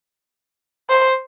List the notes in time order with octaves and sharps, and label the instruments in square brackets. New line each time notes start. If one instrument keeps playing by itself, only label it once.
[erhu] C5